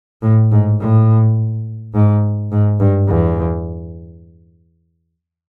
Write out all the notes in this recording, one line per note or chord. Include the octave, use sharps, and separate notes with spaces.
A2
G#2
A2
G#2
G#2
G2
E2